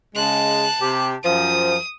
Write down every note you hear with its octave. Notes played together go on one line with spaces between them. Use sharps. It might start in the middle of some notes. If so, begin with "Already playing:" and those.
C#3 G#3 A5 F#6
C3 G4
F#2 F3 D#6